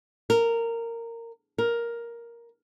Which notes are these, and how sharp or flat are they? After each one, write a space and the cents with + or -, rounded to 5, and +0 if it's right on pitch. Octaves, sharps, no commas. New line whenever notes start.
A#4 -15
A#4 +5